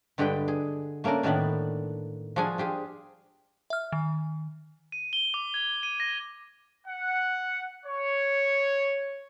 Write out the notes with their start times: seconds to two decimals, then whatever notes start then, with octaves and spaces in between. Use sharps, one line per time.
0.18 G2 D3 G#3 G4 B4 G5
0.48 G#4
1.04 A3 A#3 C#4 D4 A#4
1.23 A2 D#3 A#3 B3 D4 B5
2.36 F3 D4 F#4 G#4 F5 G#5
2.58 F4 G4 G#4
3.70 E5 F6
3.92 D#3
4.92 D#7
5.13 G7
5.34 D6
5.54 G#6
5.83 D#7
6.00 A#6
6.87 F#5
7.86 C#5